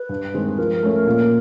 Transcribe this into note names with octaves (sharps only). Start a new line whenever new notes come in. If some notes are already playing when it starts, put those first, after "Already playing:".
Already playing: B4
G2
D#3 G#3 C4
F3 A#4
A3 C#4
A#2